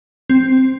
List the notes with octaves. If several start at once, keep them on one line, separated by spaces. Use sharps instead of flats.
C4